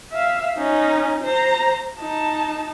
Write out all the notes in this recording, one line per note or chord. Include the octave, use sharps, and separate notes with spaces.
E5 F5
C#4 D#4
C5 A#5
D#4 A5